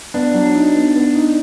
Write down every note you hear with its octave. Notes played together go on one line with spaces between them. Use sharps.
B3 D4
F#3
D#4
B3
B3
D#4